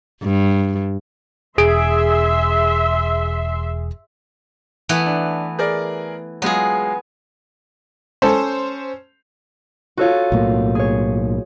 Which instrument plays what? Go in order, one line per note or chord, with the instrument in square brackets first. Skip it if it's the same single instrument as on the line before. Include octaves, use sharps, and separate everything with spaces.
[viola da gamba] G2
[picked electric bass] E1 [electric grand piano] G#4 D7 [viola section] E5 C6
[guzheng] E3 A3 B3
[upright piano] D4
G#4 A#4 D5
[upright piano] F#3 G#3 F4 [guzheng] B3 G#4
[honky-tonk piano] C#4 C5 [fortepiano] A4 C6
[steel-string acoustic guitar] D#4 F4 [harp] F#4 A4 C#5
[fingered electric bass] B1 A2 A#3
[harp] G#4 C#5